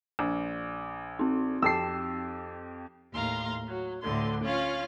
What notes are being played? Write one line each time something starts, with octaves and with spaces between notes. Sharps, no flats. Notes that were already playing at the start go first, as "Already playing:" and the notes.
A#1
C4 D#4
F2 G4 A5 E6 C7
D#2 A2 F5 A#5 C6
F#3
D2 A2 D3 C6
C#4 F4 F5